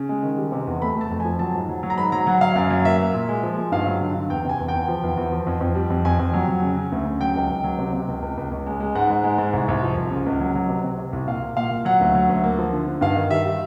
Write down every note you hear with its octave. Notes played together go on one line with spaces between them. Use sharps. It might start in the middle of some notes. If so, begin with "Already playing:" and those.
Already playing: C#3
G#3
D#3
G3
C3
E2
A3 B5
A3 A5
F2
F3 G#5
F#3 A5
G#2
F#3
F#3
A#5
G#2 B5
F#3 A#5
F#3 F#5
F#3 F5
F#2 F5
F#3
A#3 E5
A#3
A#2
G#3
F3
G#3
G2 F5
F#3
D3
D3
E2 G5
C3 G#5
E2
G5
E2
F3
E2
E2
F3
F2
F2
G3
F2
F2 G#5
F2
F#3
F#3
C#3
C#3
D2
C#3
F#3 G5
C#2
C#2
F#3
C3
C3
C#2
C#2
C#2
C#2
G#3
G#3
G#2 F#5
G#2
G#3
G#2
C2
C2
F3
C2
C#3
C#2
F#3
F#3
C3
C3
C3
C2
A#2 F5
A#2
A#2 F5
A#2
F#3 F#5
D2
F#3
D2
A#3
F3
D3
D3
G2 F5
D#3
G3 E5
G3